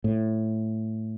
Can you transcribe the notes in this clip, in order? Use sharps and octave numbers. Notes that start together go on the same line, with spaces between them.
A2